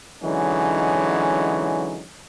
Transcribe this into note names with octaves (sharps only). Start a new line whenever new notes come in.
D3 E3 F#3 G#3 C#4 D#4